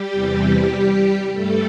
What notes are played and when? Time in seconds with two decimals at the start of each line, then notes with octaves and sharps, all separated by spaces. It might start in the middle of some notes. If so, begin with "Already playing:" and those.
Already playing: G3 G4
0.12 E2 C3 E3
1.32 G2 G3 A3 A4